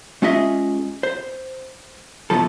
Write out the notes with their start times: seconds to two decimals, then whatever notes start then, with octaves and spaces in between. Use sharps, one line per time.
0.22 G#3 C#4 F4 G#4 D#5 E5
1.03 C5
2.30 B1 F#2 B2 E3 F3 A4